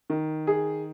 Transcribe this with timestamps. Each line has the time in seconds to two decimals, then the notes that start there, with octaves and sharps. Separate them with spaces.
0.10 D#3
0.47 G#4